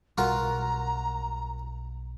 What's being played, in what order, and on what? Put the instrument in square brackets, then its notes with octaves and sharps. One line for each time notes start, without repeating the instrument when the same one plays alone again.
[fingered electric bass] B1 B2 G3 [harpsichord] F4 F#4 A#4 [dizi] A#5